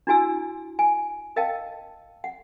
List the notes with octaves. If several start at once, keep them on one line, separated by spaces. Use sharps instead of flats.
D4 E4 F#4 G#5 E6
G#5
A#4 D#5 F5 G5 A5
F#5